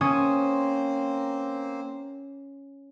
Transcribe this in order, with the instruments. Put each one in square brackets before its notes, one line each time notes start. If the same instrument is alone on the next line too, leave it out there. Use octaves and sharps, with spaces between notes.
[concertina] A#3 C4 C5 [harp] C#4 D#6